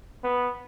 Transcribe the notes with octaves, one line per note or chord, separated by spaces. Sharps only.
B3